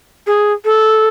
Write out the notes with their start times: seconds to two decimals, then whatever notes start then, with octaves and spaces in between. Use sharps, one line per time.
0.27 G#4
0.65 A4